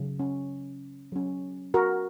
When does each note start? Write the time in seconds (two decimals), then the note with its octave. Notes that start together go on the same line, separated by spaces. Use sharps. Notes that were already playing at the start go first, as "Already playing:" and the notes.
Already playing: C#3 F#3
0.19 C#4
1.12 F#3 C#4
1.74 F#4 A#4